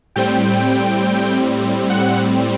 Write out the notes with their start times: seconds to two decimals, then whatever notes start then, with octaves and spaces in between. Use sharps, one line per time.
0.16 A2 G3 C4 G5
1.90 F#5